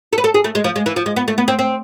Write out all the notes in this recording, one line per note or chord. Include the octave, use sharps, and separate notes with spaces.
A4
B4
A4
G#4
A3
G#3
F3
G#3
E3
F3
G#3
B3
A3
B3
C4
C4